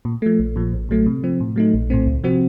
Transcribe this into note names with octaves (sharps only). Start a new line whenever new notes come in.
A#2
F3 A3
A#1
A#2 F3
A1
A2 F#3 A3
C3
F3 C4
A2
F#3 A3 D#4
A#1
A2 A3 C4
C#2
C3 F3 C4 F#4